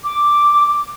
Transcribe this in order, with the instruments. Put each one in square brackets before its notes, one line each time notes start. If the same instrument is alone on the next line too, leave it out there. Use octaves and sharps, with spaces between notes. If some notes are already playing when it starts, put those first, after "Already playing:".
[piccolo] D6